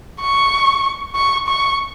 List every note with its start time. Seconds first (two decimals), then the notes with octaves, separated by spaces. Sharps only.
0.21 C#6
1.16 C#6
1.47 C#6